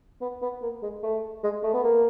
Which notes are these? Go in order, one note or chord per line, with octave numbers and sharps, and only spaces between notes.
B3
B3
A#3
G#3
A3
G#3
A3
B3
A#3